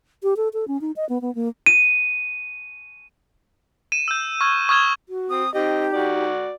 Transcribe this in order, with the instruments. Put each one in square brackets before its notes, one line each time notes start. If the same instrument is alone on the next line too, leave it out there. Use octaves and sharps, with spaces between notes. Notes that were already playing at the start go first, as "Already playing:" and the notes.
[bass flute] G4
A4
A4
C#4
D#4
D#5
B3
B3
A#3
[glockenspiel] D#7
[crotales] D#7 E7
E6 G6
C#6 F6 G#6
C#6 D#6 F6 G#6 E7 G7
[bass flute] F#4
[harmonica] C4 [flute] D#6
[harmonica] C4 D#5 [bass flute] D#4 [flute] G4
[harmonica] F#4 D5